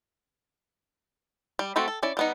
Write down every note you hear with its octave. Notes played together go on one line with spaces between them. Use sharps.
G3
A3 C4 F#4 A4 B5
A4
C#4 E4 D5
G3 B3 D#4